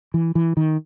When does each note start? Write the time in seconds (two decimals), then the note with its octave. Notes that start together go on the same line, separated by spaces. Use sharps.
0.14 E3
0.35 E3
0.57 D#3